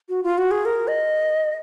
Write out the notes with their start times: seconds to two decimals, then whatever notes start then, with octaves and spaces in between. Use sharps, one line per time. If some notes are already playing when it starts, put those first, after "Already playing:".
0.09 F#4
0.23 F4
0.38 F#4
0.51 G#4
0.65 A#4
0.88 D#5